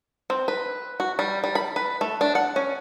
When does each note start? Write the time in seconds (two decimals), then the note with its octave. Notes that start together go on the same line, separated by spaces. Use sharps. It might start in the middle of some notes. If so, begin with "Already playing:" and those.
0.30 C4
0.48 B4
1.00 F#4
1.19 G3
1.44 G3
1.55 B5
1.76 B4
2.01 A3
2.21 D4
2.35 F#5
2.56 C#4